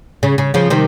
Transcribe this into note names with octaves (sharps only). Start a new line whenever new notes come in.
C#3
C#3
C#3 F3
C3 D#3